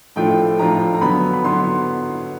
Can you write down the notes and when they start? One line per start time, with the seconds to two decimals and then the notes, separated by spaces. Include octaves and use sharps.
0.16 A2 F3 A3 D4 F4 G5
0.59 A2 F3 A3 D4 F4 A#5
0.95 A#5
1.01 D3 F#3 B3 B5
1.34 B5
1.44 D3 F#3 B3 C6